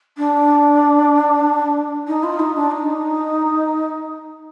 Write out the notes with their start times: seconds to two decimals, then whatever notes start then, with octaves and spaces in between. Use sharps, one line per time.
0.17 D4
2.07 D#4
2.23 F4
2.39 D#4
2.55 D4
2.71 D#4